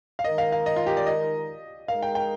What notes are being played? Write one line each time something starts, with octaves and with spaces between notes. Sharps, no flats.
F5
D#3 G#3 D#4 A#4 D#5
F5
F5
D#5
F4
G4
D5
D#5
G#3 D#4 A#4 F5
G5
G5